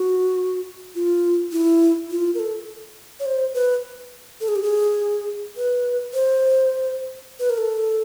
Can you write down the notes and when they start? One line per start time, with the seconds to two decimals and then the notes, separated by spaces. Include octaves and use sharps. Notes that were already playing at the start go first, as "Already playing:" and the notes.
Already playing: F#4
0.95 F4
1.52 E4
2.11 F4
2.35 A#4
2.40 A4
3.20 C#5
3.26 C5
3.54 B4
4.41 A4
4.48 G#4
4.56 G4
4.63 G#4
5.57 B4
6.14 C5
7.40 B4
7.50 A#4
7.58 A4